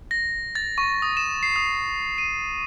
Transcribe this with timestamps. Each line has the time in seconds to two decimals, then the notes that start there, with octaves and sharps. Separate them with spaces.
0.11 A#6
0.55 A6
0.78 C#6
1.02 D#6
1.17 E7
1.43 C7
1.56 D#6
2.18 D#7